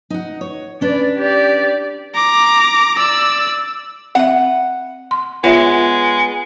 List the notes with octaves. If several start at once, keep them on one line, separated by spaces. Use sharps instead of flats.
D#4 F#5
C#5
C#4 D4 B4 D5
G4 D5
A#5 D6
D5 E6
C4 E5 F#5
C6
G#3 B3 F4 C#5 E5